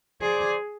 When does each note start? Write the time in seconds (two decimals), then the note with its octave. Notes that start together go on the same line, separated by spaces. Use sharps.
0.21 G#4 C5 D5